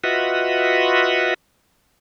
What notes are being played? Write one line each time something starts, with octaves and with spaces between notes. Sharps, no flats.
F4 F#4 B4 D#5 E5 F#5